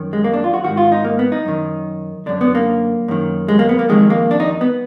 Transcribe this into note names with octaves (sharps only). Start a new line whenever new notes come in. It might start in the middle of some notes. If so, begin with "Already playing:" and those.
Already playing: F#2 D#3
G#3
A#3
D4
F4
F#4
G#2 D#3 F#4
F4
D#4
A#3
B3
D#4
F#2 D#3
F#2 D3 D4
B3
A#3
F#2 D#3
G#3
A#3
B3
A#3
F2 D#3 G#3
A#3
D4
D#4
B3